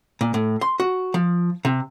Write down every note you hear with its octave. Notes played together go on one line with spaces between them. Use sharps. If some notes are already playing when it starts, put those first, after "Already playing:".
A#2
A2
C6
F#4
F3
C3